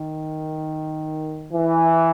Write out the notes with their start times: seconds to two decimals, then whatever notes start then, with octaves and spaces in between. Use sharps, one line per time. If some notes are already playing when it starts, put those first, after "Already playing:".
Already playing: D#3
1.53 E3